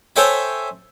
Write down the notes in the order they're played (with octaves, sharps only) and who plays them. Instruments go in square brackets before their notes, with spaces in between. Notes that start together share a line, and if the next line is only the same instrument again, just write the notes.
[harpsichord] A4 C5 C#5 E5 G5 G#5